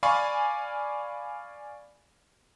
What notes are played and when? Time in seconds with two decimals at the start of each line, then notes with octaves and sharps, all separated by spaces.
0.03 D5 F5 G#5 B5 C#6